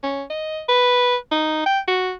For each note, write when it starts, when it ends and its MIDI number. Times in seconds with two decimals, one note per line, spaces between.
0.03 0.23 61
0.30 0.61 75
0.68 1.16 71
1.31 1.62 63
1.66 1.79 79
1.88 2.12 66